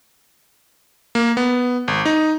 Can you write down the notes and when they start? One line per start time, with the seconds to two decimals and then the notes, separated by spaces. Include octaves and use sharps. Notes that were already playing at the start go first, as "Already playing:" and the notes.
1.15 A#3
1.37 B3
1.88 G#1
2.05 D#4